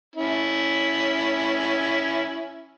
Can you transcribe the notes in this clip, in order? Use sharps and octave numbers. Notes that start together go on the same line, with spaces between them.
C#4 E4